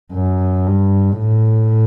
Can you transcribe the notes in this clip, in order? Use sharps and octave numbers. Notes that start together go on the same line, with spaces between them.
F#2
G2
A2